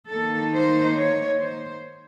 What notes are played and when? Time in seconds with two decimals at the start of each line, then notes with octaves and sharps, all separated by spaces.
0.10 D#3 A#3 D#4 A4
0.54 C5
0.97 C#5
1.41 C5